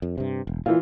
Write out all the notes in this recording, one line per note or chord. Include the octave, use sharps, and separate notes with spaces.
F2
G2 C3
E1
A#2 E3 F4